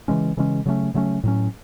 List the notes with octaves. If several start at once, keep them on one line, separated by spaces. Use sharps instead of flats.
C#3 E3 G#3 C#4
C#3 E3 G#3 C#4
C#3 F#3 A3 C#4
C#3 F#3 A3 C#4
A2 F#3 C#4